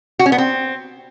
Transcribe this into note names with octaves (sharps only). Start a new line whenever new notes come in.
F#4
C#4
B3
C4